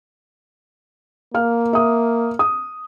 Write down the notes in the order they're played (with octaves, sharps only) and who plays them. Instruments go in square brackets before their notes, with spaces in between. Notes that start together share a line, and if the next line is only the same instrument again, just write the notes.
[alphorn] A#3 [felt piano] F5 F6
[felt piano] E5 D#6
D#6